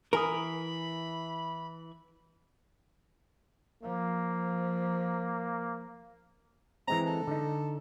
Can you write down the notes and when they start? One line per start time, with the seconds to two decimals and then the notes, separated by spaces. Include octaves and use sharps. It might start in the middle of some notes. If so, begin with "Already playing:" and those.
0.13 E3 A#4 G#5 B5 D#6
3.83 F3 A#3
6.88 E3 G#3 C4 A#5
7.06 A4
7.27 D3 D#4